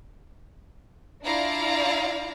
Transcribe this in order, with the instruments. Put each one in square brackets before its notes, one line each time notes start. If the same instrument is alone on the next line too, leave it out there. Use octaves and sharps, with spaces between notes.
[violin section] D4 E4 F4 D5 F5 A#5